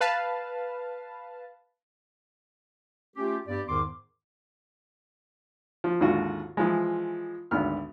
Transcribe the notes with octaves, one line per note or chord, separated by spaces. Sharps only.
B4 F5 A5
A3 C#4 F4 G4
G2 B3 G4 D5
E2 G#2 D#3 C6 D6
F3
G#1 D#2 G#2 D3 F4 F#4
E3 F3 G#3
G#1 D2 B3 F6